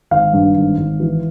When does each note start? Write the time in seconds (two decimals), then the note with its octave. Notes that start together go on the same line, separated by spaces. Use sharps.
0.11 G#1 F5
0.33 G2
0.56 G#1
0.77 G#1
1.00 E3